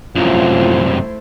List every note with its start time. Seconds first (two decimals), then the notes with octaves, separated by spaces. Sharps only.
0.15 C2 F#2 F3 A3 E4 C5